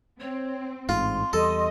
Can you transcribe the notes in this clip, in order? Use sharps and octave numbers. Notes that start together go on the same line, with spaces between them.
C4 C#5
A1 G#2 F4 C6
E2 G3 A4 D#5